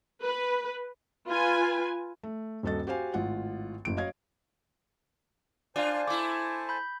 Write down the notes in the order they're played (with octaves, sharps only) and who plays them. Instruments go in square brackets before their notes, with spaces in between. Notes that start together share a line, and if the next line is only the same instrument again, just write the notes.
[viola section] B4
F4 B4 G#5
[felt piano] A3
D#1 G2 F#4 A4 D#5 A6
F#4 G4 C5 F5 G#5
G#1 A2 F4 F#5
F#1 A2 D7
F#3 C#5 D#5 F5 G#6
[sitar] D4 F4 [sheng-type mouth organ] C5 G#5 A5 [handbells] D5 F5
[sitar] A3 E4 [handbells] D6
[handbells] B5 G6